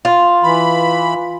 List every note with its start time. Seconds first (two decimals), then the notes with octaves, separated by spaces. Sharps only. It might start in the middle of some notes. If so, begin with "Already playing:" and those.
0.05 F4
0.43 E3 B5